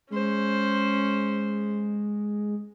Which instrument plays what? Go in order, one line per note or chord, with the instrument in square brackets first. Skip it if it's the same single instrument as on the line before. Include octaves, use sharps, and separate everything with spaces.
[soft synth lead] G#3 [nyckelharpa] C#4 C5